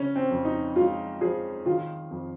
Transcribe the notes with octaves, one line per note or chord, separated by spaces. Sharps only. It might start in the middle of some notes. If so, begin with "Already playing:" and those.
Already playing: C#3 C#4
C4
F2
D#4
G#3 F4
F3 G#4
D#3 F4
F2